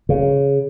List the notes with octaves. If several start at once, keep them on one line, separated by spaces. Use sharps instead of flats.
C#3